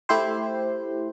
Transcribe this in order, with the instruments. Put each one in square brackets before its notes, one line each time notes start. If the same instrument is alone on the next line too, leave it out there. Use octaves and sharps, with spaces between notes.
[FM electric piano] A3 E4 G4 C5